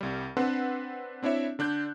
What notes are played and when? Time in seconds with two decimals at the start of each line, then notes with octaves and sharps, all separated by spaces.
0.01 C2 G3
0.37 C4 D4 A4 B4 F#5 C6
1.23 C4 D4 E4 C#5 E5
1.59 D3 D4 F#6 G6